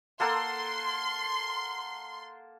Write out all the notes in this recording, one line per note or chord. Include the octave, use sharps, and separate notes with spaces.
A#3 A4 F#5 C6